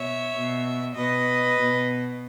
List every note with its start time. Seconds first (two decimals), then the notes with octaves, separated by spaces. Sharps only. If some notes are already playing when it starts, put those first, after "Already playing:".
Already playing: B2 C#5 E5
0.35 B2
0.96 B2 B4 D#5
1.58 B2